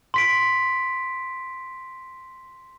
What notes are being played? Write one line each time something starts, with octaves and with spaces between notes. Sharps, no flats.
C6 B6 D7